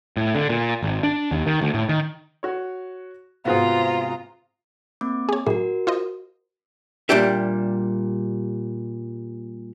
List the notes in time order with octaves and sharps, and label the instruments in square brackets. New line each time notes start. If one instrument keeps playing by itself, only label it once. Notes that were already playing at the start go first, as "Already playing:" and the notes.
[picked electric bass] A2
D3
A#2
G#1
D4
D#2
D#3
D2
A2
D#3
[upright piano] F#4 C#5
[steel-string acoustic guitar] G#2 C3 [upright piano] B3 F#4 G#4 [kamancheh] F4 A#5
[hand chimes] A#3 C4 D6
[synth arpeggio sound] G#4 C#5
[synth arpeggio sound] A2 F#3 G#4 [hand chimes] F#4 A#4
[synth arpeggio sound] F4 C5 D#5
[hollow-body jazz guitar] A#2 G3 D4 G4 E5